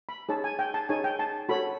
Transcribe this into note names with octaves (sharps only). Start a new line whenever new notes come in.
B5
D#4 G#4 C#5 A5
G#5
G5
A5
D#4 G#4 C#5 G#5
G5
A5
F#4 A4 C#5 B5